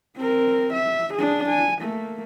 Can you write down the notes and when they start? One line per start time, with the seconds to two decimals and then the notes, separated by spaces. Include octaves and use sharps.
0.17 C4 A#4
0.74 E5
1.14 D4 G#4
1.49 G#5
1.80 A3 A#3